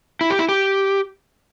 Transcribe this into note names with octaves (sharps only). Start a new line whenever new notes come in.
E4
G4
E4
G4